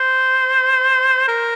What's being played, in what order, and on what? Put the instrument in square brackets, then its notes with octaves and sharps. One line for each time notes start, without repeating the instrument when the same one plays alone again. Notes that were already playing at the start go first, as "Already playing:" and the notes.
Already playing: [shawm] C5
A#4